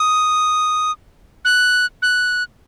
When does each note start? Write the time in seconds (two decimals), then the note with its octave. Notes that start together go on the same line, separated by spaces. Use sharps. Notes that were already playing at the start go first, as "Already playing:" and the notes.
Already playing: D#6
1.45 F#6
2.02 F#6